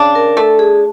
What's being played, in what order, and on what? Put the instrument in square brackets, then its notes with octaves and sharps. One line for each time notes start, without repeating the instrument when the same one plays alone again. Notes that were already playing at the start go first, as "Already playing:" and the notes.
Already playing: [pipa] C#3 D4
[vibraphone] A#4
[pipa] A3 [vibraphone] A4
[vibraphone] G#4